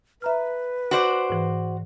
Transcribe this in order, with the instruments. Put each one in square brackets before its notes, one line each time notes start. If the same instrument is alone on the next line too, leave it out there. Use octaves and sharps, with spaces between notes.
[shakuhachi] B4 [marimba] E5 A#5 F6
[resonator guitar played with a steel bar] F#4 C5 D5
[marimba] G#2 E3